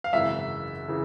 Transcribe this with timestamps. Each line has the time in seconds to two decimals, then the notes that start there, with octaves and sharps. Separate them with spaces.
0.04 F5
0.13 G#1 F#2 C#3 E3 E5
0.88 C#3 E3